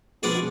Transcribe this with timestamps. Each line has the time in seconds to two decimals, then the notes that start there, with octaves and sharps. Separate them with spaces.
0.22 B2 F3 B3 D4 G#4 D5
0.35 B2